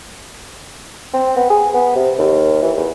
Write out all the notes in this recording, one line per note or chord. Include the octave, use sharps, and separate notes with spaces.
C4
B3
G#4
B3
C3
D#2
E3
E2